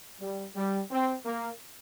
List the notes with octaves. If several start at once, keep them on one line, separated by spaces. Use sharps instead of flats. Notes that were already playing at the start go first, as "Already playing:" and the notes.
G3
G3
C4
A#3